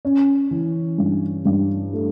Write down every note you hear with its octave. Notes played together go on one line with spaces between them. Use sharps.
C#4
E3
G2
G2
A3